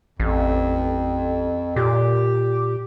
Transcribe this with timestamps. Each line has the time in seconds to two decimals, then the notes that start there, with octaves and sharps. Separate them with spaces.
0.20 A1 F2
1.76 A#2 G4